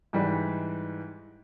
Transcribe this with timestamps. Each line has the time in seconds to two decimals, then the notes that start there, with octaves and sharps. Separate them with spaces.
0.13 G#2 E3 G3